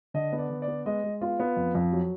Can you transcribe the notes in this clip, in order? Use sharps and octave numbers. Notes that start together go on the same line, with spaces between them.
D3 D#5
B3
D5
D3
D5
B3
G#3 D#5
G#3
B3 F4
B3
F2
F2
F#3